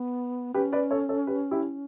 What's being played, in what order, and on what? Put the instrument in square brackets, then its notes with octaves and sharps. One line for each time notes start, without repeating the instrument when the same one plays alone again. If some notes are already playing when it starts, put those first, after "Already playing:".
Already playing: [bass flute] B3
[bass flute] C#4 [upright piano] G4 B4
[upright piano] B4 D5
A4 C#5
A4 C#5
G4 B4
E4 G4